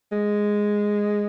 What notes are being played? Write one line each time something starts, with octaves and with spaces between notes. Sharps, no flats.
G#3